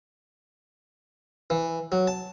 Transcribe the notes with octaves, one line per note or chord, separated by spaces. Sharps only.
E3
F#3
A5